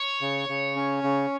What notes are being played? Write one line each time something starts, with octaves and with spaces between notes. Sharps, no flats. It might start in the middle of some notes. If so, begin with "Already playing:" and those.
Already playing: C#5
C#3
C#3
C#4
C#3